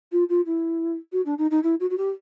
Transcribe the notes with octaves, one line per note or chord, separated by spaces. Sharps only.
F4
F4
E4
F#4
D4
D#4
D#4
E4
F#4
F#4
G4